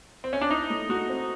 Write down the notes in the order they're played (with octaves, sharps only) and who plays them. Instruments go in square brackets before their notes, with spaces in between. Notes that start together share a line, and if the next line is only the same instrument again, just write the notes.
[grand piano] C4
C#4
D4
[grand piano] D#4 [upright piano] E4
[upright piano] A3
[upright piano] A3 [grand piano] F#4
[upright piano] C4